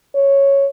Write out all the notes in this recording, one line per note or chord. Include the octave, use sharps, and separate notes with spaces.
C#5